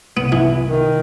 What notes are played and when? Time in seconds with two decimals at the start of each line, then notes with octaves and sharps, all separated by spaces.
0.17 C2 B3
0.32 E3
0.67 D#3